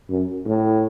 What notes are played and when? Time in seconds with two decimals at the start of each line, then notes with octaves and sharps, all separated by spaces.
0.10 F#2
0.45 A2